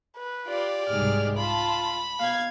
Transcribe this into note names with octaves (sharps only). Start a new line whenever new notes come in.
B4
F4 G4 D5
C2 G#2 G#4 F6
F4 A5 B5
B2 F5 G#6